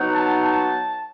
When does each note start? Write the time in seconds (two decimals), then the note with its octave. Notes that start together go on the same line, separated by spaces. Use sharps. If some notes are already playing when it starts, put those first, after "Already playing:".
Already playing: F#3 B3 D#4
0.14 A5
0.42 A5